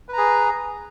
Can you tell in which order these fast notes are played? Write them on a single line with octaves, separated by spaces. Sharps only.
B4 A#5 G#4